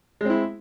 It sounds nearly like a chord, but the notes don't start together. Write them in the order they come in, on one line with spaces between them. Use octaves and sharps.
G#3 C4 E4